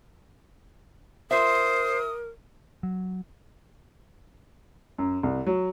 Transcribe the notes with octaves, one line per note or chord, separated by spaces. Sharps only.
F4 A#4 C5 E5 D#6
F#3
F#2
C2
F#3